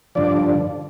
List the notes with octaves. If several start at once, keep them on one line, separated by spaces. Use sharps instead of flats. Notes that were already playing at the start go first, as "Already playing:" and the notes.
G2 D3 F3 D5